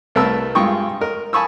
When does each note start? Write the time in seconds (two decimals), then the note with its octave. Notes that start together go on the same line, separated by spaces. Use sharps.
0.15 C2 A3 A#4 B4 A5 E6
0.55 G2 G#3 F4 G5 C#6 D#6
1.01 A#4 D#5
1.33 G#5 A5 B5 C#6 D#6 E6